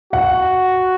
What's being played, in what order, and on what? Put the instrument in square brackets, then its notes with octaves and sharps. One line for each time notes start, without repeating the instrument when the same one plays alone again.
[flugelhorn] F#4 [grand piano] F#5